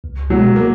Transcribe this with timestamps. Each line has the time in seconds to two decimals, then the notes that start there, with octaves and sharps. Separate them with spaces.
0.04 C#2
0.30 B2 F#3 G#3
0.56 A#3